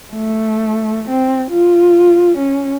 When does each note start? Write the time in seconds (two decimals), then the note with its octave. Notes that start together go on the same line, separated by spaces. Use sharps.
0.13 A3
1.09 C4
1.51 F4
2.38 C#4